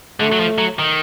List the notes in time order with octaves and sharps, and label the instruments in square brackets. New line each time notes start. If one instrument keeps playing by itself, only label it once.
[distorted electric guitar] D3 [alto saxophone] A3
[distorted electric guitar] F#3
F3
F#3
D#3